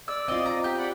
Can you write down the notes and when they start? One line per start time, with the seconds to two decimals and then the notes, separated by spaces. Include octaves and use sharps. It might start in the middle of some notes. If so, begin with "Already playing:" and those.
0.08 D5 E6
0.28 C4 F4 D#5
0.46 A#5
0.64 G4
0.78 D5 F#5 B5